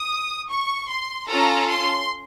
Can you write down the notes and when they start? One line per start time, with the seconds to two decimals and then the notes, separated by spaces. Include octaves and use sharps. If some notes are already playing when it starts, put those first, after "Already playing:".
Already playing: D#6
0.49 C#6
0.89 C6
1.28 C#4 F4 A4 A#5
1.69 C6